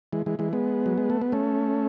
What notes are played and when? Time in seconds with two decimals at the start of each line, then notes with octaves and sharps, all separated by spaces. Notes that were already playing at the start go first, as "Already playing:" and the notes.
0.13 E3 G#3
0.26 E3 G#3
0.39 E3 G#3
0.53 G#3 B3
0.86 F#3
0.98 G#3
1.10 A3
1.22 B3
1.32 A3 C#4